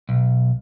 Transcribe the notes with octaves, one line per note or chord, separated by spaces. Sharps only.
B1